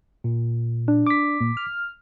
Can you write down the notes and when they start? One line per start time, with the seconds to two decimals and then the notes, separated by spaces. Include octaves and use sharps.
0.24 A#2
0.88 D4
1.07 D6 B6
1.41 A#2
1.57 F6